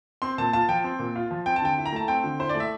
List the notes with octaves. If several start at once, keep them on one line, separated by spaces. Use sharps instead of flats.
C4 C6
A#2 A5
F4 A5
F3 G5
C4
A#2
F4
F3
C4 G5
A5
D3 G5
E4
A#5
A3 A5
C4 G5
D3
E4 C5
D5
A3
E5